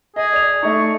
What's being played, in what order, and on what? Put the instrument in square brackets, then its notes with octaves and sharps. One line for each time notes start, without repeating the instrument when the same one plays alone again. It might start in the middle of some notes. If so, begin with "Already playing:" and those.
[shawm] G#4 [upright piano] D#5
[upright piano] D5 F7
[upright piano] A3 D#4 [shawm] C#6